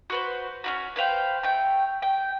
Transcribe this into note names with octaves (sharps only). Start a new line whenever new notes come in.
F#4 B4 C5
C#4 E4 F#4
B4 C5 F5 G5
A3 G5
G5